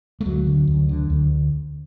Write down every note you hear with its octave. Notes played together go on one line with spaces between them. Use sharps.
A3
D2 F#3
D3
D2
D3
D2